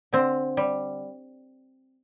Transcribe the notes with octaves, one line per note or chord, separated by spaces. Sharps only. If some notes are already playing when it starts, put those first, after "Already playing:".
D3 C4
G3